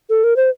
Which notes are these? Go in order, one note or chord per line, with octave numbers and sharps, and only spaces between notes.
A4
A#4
C5